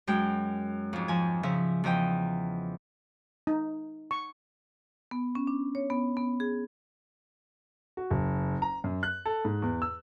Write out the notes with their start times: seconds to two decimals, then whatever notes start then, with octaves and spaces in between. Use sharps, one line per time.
0.07 F#2 G#3 G5
0.93 F2 G#2
1.08 F3 G#5
1.43 C#3 F3 E5
1.84 E2 F3 D#5 G5
3.47 D#4
4.11 C#6
5.11 B3
5.35 C#4
5.47 D4
5.75 C#5
5.90 B3
6.17 B3
6.40 G#4
7.97 F#4
8.10 F#1
8.62 A#5
8.84 F#2
9.03 F#6
9.25 A4
9.45 G#2
9.62 E2
9.82 E6